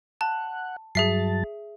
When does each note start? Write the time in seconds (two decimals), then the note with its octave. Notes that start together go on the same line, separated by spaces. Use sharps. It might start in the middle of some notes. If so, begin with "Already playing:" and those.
0.21 F#5 A5
0.95 G2 F#3 G#4 E5 A5 C7